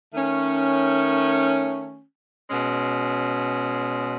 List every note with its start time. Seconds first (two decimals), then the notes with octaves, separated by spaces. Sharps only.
0.12 D#3 A3 C#4
2.50 B2 G#3 C#4